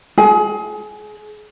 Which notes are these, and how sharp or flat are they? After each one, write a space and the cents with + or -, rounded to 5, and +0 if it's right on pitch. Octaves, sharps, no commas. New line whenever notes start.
G#4 +30